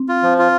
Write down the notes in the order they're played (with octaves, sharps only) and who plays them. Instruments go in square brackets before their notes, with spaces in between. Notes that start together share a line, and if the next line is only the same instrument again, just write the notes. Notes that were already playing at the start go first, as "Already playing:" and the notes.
Already playing: [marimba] C4
[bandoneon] F4
F3
F4